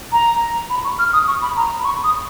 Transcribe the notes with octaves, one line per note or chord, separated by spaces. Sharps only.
A#5
B5
C#6
F6
D#6
C#6
B5
A#5
B5
C#6
D#6